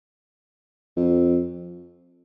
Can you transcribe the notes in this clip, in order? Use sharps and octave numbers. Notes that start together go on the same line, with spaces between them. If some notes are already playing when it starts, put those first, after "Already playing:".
F2